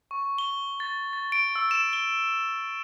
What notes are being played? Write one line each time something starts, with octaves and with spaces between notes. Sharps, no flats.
C#6
G7
A6
A6
D7
E6
E7
G7